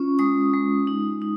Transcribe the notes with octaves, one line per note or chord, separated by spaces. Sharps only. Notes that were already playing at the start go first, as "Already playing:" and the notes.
Already playing: C#4 F4 C#6
G#3 D#6
G#3
D#4
D#4